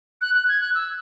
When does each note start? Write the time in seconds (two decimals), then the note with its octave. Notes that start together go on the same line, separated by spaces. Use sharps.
0.22 F#6
0.35 F#6
0.49 G#6
0.61 F#6
0.75 E6